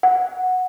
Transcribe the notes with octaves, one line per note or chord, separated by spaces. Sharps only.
F#5